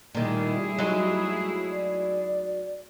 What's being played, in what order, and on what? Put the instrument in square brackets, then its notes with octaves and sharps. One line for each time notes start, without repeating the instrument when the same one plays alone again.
[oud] A#2 D#3 [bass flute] G3 [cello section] A3 E4 G#4
[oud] F#3 G#3 D#4
[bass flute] D5